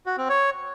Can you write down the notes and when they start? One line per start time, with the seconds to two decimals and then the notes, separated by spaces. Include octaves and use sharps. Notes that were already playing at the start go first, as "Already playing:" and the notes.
0.06 F#4
0.18 C4
0.29 C#5